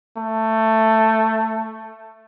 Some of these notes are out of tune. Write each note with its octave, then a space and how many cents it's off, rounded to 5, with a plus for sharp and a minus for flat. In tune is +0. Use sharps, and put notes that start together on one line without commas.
A3 +10